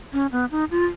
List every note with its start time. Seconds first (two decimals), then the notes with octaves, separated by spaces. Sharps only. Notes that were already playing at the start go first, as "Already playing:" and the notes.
0.13 C#4
0.32 B3
0.51 D#4
0.71 F4